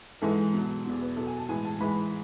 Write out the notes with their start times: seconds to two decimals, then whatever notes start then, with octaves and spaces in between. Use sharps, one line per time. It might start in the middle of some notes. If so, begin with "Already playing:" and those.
0.22 G#2 E3 G#3 A4
0.53 B2 F#3
0.85 E2 B2 F#3
1.01 B4
1.16 B2 F#3 A4
1.27 G#5
1.38 A5
1.49 A2 E3 G#3 G#5
1.65 A5
1.80 G#2 E3 G#3 B5